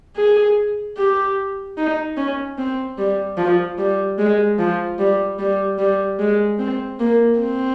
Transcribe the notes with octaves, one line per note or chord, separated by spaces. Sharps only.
G#4
G4
D#4
C#4
C4
G3
F3
G3
G#3
F3
G3
G3
G3
G#3
C4
A#3
C4